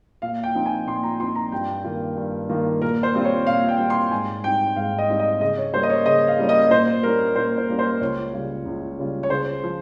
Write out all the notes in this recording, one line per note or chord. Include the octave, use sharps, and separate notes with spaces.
A#2 F5
G5
F3 C4 D#4
G#5
A#2 C6
A#5
F3 C4 D#4 C6
A#5
G2 G5
D#3 A#3 F4
G2
D#3 A#3 F4
A#2 A#4
C5
G3 C4 F4
C#5
A#2 F5
G5
G3 C4 F4
C6
G#2 G#5
G3 C4 D#4 G5
G#2 F5
D#5
G3 C4 D#4
D#5
C#3 D#5
C#5
G3 A#3 C#4 C5
D#5
C#5
C#3 D#5
F5
G3 A#3 C#4
D#5
A#2 C5
G3 A#3 C#4 A#4
A#2 C5
C5
G3 A#3 C#4
C5
C#2 C#5
C#3 G3 C#4 F4
C#2
C#3 G3 C#4 F4
C#5
C#3 C5
F3